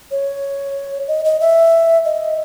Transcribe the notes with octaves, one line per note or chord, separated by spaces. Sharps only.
C#5
D#5
D#5
E5
D#5